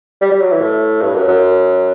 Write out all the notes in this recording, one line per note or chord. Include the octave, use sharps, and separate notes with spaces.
G3
G3
F#3
E3
A2
G2
F#2
F#2